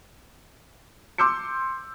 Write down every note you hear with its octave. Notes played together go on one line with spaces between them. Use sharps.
C6 D6 E6 G6 C#7